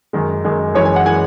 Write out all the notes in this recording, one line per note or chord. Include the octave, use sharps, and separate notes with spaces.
F#2 D#3 G#3
F#2 D#3 G#3
F#2 E3 G#3 C#5
G#5
F#5
E3 G#3 G#5